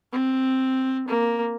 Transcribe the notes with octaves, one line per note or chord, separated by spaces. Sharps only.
C4
A#3